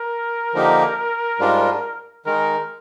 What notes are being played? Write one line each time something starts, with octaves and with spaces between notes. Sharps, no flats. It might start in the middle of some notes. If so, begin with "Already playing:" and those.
Already playing: A#4
D3 F3 A#3 D#4 G4
G#2 G3 D4 F4
D#3 G#3 D#4 A#4